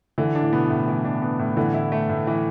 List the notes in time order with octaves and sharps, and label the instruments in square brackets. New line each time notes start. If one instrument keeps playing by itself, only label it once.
[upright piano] D3 [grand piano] E3
[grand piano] D4
[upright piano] A2
[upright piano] B2 [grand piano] B3
[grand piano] A2
E3
D4
B3
A2
[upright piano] D3 [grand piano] E3
[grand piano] E4
A3
A2
E3